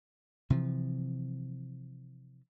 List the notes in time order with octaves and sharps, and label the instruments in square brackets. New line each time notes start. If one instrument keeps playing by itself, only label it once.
[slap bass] C3 E3 F3